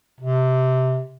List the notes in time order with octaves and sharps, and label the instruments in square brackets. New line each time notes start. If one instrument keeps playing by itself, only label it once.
[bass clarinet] C3